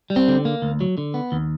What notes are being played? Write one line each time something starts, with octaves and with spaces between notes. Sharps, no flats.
G3
C4
D3
A#3
D2
F#3
D3
B3
D#2